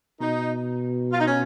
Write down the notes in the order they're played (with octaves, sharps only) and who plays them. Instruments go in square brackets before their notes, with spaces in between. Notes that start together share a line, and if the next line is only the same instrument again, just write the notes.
[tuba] B2 [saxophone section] D#4
[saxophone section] F4
D#4
C#4